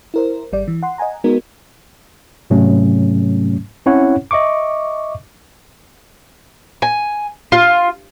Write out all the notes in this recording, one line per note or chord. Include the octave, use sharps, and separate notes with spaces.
E4 A#4 C5
G#1 G3 D5
E3
F#5 C6
D#5 F#5 G#5 A#5
G#3 B3 D#4 F#4 A#4
G#2 C3 F#3 A3 C#4
C4 C#4 E4 C#5 F#5
D#5 E5 C#6 D6
G#5
F4